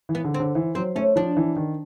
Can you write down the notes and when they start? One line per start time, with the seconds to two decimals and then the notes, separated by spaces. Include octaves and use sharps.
0.09 E3
0.15 B3
0.25 D3
0.34 C4
0.40 D3
0.55 E3
0.75 F#3 C4
0.95 A3 C#4
1.16 F3 D4
1.37 E3
1.56 D#3